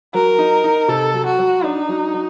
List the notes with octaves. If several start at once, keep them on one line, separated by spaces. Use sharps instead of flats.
F#3 A#4
D#4
D#4
C3 A4
F#3
F#4
F#3
D4 D#4
F#3
F#3